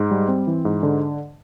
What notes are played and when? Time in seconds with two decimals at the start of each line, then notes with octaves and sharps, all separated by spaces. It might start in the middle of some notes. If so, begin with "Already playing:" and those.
Already playing: G#2
0.11 G3
0.28 C4
0.47 E3
0.65 G#2
0.83 D3